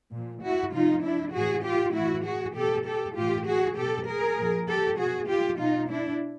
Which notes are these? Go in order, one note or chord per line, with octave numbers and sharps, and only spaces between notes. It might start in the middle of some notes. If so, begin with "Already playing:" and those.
A#2 F3
E4 F#4
C3 F3 D#4 F4
D4 E4
A2 E3 F#4 G#4
F4 G4
A2 E3 E4 F#4
F#4 G#4
B2 G4 A4
G4 A4
A2 E3 F4 G4
F#4 G#4
B2 G4 A4
G#4 A#4
A#2 F3
G4 A4
B2 F#4 G#4
F4 G4
B2 D#4 F4
D4 E4